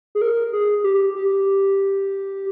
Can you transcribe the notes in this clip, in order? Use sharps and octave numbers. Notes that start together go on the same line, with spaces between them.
G#4
A#4
G#4
G4
G4